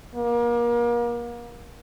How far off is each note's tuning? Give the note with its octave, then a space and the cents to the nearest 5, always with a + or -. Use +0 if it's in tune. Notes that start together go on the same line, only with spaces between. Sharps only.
A#3 +35